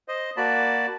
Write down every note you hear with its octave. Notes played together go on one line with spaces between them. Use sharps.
C5 D#5
A#3 F#4 D5 A5 B5